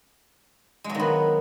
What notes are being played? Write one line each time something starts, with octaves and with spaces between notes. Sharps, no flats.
G#3
F#3
D#3
B3